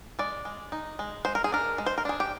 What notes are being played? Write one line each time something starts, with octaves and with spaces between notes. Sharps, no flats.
G#3 D5
G#3
D#4
G#3
G#3 C5
A#4
G#4
D4 A#4
G#3
C5
A#4
D4 G#4
G4